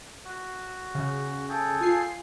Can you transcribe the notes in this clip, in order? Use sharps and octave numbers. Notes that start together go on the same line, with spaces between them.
F#4
C#3
G#4 A4 G5
F4 G#5 C7